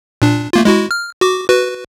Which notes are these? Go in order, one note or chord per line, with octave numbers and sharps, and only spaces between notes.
A#2 D4
A3 A#3 F4
G#3 E4 F#4
F6
F#4 D6
F#4 B4